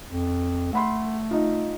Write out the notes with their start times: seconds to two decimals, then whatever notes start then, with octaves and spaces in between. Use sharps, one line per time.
0.08 F2
0.73 A3 F#5 B5 C6
1.31 D#4 F4